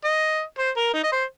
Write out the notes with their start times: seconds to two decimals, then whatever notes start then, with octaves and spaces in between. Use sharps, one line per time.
0.04 D#5
0.58 C5
0.77 A#4
0.94 D#4
1.04 D#5
1.12 C5